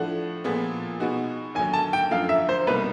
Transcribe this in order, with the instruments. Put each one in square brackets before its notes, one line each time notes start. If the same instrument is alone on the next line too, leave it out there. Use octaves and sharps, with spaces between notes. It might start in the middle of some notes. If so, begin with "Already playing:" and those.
Already playing: [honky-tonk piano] A2 F3 A3 D4 [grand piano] F#5
[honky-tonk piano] A#2 F3 G#3 B3
B2 G#3 B3 D#4 F#4
[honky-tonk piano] D#2 D3 F#3 [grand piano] G#5
[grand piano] A5
G5
[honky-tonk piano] F#2 D3 F3 A3 [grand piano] F5
[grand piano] E5
C5
[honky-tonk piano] C2 B2 G3 A#3 D#4 [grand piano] B4